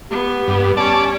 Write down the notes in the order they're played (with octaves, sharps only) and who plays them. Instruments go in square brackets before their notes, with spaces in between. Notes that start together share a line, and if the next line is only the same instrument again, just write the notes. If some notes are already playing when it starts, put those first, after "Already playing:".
[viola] B3 [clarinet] G4
[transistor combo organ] G2
[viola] C#4 C#5 [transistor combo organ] D5 A5